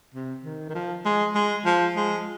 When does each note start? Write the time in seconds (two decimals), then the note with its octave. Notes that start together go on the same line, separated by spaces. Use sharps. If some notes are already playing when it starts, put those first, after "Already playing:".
0.14 C3
0.44 D#3
0.69 D#3
0.75 F3
1.05 G#3
1.35 G#3
1.65 F3
1.96 G#3